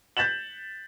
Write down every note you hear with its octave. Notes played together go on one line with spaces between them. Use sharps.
G6 A6 B6 E7 F#7